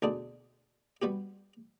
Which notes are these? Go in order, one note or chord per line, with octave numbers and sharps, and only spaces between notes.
D2 B2 D4 G#4 D5
G3 B3 F#4 G4